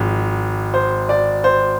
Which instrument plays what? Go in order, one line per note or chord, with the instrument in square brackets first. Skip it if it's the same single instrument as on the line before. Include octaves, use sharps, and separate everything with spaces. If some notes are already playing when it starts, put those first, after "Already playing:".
Already playing: [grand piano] G#1 G#2 F3 G#3
C5
D5
C5